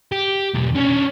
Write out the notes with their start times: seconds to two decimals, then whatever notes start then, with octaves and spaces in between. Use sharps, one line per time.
0.12 G4
0.55 B1 E2
0.76 C#4 D4